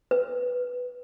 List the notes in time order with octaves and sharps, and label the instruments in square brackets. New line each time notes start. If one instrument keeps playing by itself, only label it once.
[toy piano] B4